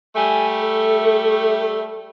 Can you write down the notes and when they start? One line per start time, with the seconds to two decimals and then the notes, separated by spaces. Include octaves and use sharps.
0.16 G3 A3 G#5
0.60 A4